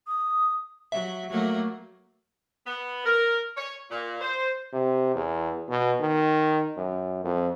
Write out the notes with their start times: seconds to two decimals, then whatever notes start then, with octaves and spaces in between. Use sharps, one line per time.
0.07 D#6
0.92 F#3 E5
1.31 F#3 A3 A#3
2.67 B3
3.06 A#4
3.57 C#5
3.90 A#2
4.21 C5
4.73 C3
5.14 E2
5.69 B2
6.00 D#3
6.76 F#2
7.24 F2